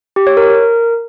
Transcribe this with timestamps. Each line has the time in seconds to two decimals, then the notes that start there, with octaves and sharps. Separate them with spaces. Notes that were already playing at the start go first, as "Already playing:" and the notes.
0.16 G4
0.27 C#5
0.37 A#4